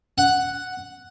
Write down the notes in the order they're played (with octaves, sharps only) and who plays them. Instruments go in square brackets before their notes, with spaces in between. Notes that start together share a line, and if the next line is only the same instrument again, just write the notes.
[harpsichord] F#5